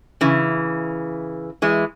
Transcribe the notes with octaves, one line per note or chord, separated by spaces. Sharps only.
C#3 E3
E3 G#3